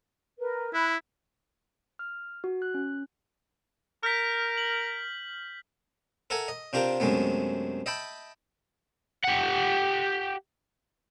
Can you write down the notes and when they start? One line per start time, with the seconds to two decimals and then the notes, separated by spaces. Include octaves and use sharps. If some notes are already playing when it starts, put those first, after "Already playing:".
0.39 A#4 B4
0.74 E4 B5 F#6
1.99 F6
2.44 F#4
2.62 F#6
2.74 C#4
4.03 A#4 F6 G6 B6
4.57 F#7
6.30 A4 A#4 E5 F#5 G#5
6.48 D#5
6.73 C3 D4 F4 G4 A#4
7.00 F#2 C3 G#3 A3 B3
7.86 D#5 E5 G5 A5 B5
9.24 G4 F#5